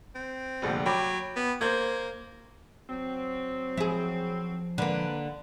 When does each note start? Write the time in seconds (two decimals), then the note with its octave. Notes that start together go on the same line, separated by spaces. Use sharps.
0.15 C4
0.62 F1 A#1 D3
0.86 F#3 G5 B5 D6
1.36 B3
1.61 A#3 C5 G6 G#6
2.89 F#3 C4
3.77 F3 E4 G#4
4.78 D3 A#3 B4 D5